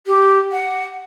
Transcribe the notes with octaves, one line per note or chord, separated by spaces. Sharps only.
G4
F#5